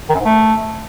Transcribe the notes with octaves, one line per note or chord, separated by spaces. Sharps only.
D#3
F#2
G#2
A3